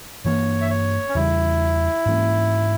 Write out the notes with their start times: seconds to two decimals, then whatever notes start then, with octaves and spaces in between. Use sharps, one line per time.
0.25 G2 E3 A#3 C#5
0.61 E5
0.70 C#5
1.09 C#4
1.15 E2 C#3 G3 E4
2.06 G#2 E3 A#3 C#4